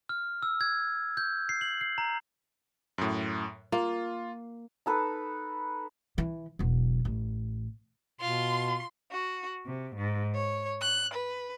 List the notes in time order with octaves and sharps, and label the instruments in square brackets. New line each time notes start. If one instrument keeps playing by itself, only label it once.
[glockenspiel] F6
E6
G#6
G6
C7
F#7
C7
A#5
[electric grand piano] F#2 A2
[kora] A#3 [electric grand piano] F4
[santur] D#4 A4 B4
[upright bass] E3
E1 F#3
A1
[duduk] B2 [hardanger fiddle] F4 [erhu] C6
[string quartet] F#4
C3
G#2
C#5
F#6
B4